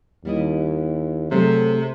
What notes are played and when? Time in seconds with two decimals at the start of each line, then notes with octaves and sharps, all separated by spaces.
0.25 D#2 G3 E4 D#5
1.31 C3 F#3 A3 G#4 A4